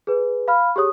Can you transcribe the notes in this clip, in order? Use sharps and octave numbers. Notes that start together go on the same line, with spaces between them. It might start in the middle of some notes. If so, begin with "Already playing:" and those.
G#4 B4
F5 B5 F6
G4 G#4 C#5 D#6